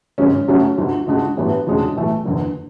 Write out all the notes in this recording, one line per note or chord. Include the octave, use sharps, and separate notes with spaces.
G#1 F#2 C#3 G#3 C#4
F#2 C#3 F#3 A3 C#4
D2 D3 F#3
D2 C#3 G#3 D4 F#4
A1 A2 F#3 B3 D4
E1 D2 C#3 G#3 D4
B1 A2 E3 A3
F#1 E2 D3